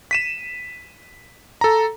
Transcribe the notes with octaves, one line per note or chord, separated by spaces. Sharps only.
B6 D#7 E7
A4 A#5